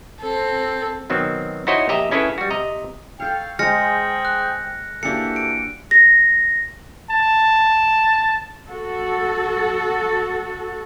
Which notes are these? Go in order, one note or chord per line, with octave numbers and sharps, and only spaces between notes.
C4 A4
B2 D#3 F#3 C4
D#4 E4 F#4 C5 C#5 D#5
A#1 G4 D#5 E5 A#5
C#4 E4 G#4 A4 B4 C#5
G3 F#4
C3 D#5 A#5
A4 C#5 F5 G5
G#3 G#4 C5 G5 A#5 F6 A#6 C#7
F#6
E3 A#3 D4 F#4 G4 A4 C#7
D7
A#6
A5
F#4 A4